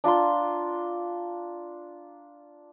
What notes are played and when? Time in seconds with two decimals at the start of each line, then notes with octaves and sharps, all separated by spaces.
0.04 D4 F4 A#5 C6